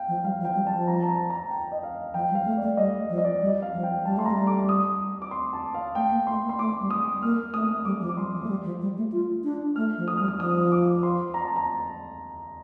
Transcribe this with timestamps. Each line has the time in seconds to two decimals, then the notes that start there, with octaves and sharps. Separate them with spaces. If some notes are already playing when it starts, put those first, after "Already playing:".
Already playing: F5 G5
0.08 F3
0.24 G3 F5
0.40 F3
0.45 G5
0.55 G3
0.67 A5
0.72 F3
0.87 A#5
1.03 A5
1.08 A#5
1.30 A#5
1.50 G5
1.72 D#5
1.83 F5
2.14 F3 G5
2.31 G3
2.35 F5
2.46 A3
2.57 A3 D5
2.77 G3 D#5
3.09 F3 D5
3.18 D#5
3.24 D5
3.41 G3
3.62 F5
3.73 F3
3.83 G5
4.05 G3 A5
4.17 A3 C6
4.25 G3 A#5
4.47 D6
4.69 D#6
5.22 D6
5.31 C6
5.53 A5
5.74 F5
5.95 A3 G5
6.10 A#3
6.27 A3 C6
6.43 A#3
6.49 C6
6.59 A3 D6
6.80 G3
6.90 D#6
7.22 A#3 F6
7.53 A3 D#6
7.85 G3 D6
8.01 F3
8.09 D6
8.17 G3 C6
8.34 F3
8.43 A3
8.48 G3
8.64 F3
8.81 G3
8.97 A3
9.12 F4
9.44 D4
9.76 A3 F6
9.98 F3
10.08 D#6
10.17 G3 F6
10.28 D#6
10.39 F3 D#6
10.72 D6
11.03 C6
11.34 A#5
11.45 A5
11.56 A#5